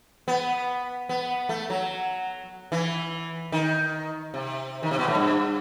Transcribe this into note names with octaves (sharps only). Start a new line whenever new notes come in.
B3
B3
A3
F#3
E3
D#3
C3
D#3
C3
B2
A2
G2